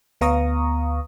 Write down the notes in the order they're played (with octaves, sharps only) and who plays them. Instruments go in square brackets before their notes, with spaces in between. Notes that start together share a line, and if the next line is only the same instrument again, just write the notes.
[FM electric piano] D2 B3 F5 A#5 C#6 D#6